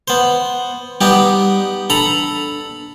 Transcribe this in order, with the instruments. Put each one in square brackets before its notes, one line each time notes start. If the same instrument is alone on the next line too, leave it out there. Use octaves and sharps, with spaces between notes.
[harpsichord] B3 C5
[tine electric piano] G3 [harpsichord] B3 D#4 G4
[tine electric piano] D4 [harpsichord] A4 A#5 B5